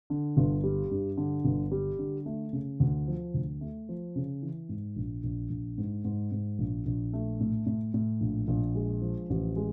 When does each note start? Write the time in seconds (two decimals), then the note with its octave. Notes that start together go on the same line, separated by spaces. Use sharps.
0.10 D3
0.37 G1
0.64 G3
0.91 G2
1.17 D3
1.44 G1
1.71 G3
1.99 D3
2.26 A3
2.53 C#3
2.80 D2
3.08 F3
3.34 D2
3.61 A3
3.89 F3
4.16 C#3
4.42 E3
4.69 G#2
4.96 A#1
5.24 A#1
5.50 A#1
5.78 G#2
6.05 G#2
6.32 G#2
6.59 A#1
6.86 A#1
7.13 A3
7.40 A2
7.66 A2
7.94 A2
8.21 A#1
8.48 A#1
8.75 G#3
9.02 F3
9.30 A1
9.56 G#3